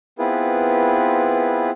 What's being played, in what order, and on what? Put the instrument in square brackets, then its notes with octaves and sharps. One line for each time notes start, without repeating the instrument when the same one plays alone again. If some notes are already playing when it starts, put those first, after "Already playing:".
[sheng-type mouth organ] B3 C4 E4 F4 G#4 B4